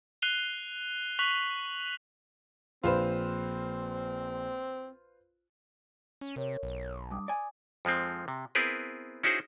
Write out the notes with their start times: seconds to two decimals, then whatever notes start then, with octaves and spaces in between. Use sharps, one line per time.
0.22 F#6 C7 D#7 F7 G7
1.19 C#6 F#6 B6 F7 F#7
2.84 A#1 C4 F4 B4 C5
6.21 C#4
6.36 C3 A#4 C#5
6.63 B1
7.11 G2 D6 D#6
7.28 D5 G#5
7.85 F2 F3 G#3 C4
8.28 C3
8.55 B3 C4 E4 G#4 A#4 B4
9.23 C#4 D#4 E4 F#4 G#4 C5